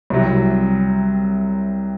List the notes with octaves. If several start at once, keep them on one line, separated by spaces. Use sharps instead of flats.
C2 C3 F#3